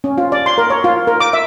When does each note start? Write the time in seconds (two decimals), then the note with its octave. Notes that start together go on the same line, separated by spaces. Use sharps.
0.04 C#4
0.18 F4
0.32 D5
0.46 C6
0.58 A#4
0.70 C#5
0.84 F4
1.07 A#4
1.20 D6
1.33 E5